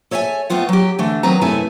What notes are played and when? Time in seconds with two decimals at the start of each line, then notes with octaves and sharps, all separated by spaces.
0.11 A4 C#5 E5 F#5 G#5
0.50 A3 B3 C4 F4 F#5
0.69 F#3 G4
0.99 D3 E3 A3
1.23 D#3 F#3 B3 C4 B4 A#5
1.41 F#2 C3 A3 E4 B4 G#5